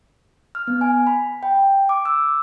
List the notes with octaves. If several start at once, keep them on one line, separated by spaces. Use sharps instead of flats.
F6
B3
G#5
B5
G5
D6
E6